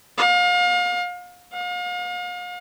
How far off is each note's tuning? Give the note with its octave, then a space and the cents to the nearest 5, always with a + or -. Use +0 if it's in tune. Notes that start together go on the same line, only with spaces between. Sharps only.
F5 +35
F5 +40